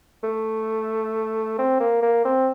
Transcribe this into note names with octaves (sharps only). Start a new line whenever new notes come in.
A3
C4
A#3
A#3
C4